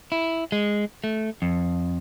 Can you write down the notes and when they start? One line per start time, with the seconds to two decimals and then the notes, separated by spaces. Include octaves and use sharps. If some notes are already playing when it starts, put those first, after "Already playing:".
0.12 E4
0.52 G#3
1.04 A3
1.42 F2